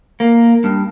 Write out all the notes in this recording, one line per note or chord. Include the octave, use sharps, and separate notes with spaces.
A#3
G2